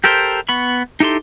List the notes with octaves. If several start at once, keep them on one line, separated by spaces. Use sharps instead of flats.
G4 A4 A#4 C5
B3 B5 C#6
D#4 E4 G4 A4 C6